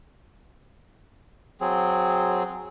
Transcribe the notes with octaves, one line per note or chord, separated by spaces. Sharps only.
F#3 C4 G#4